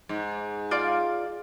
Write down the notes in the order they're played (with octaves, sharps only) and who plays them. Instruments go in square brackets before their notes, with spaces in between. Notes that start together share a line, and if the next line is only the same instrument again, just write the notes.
[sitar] G#2
[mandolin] F4 D5 F6